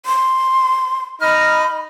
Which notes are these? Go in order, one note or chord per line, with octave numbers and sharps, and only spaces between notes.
C6
D#4 B5 F6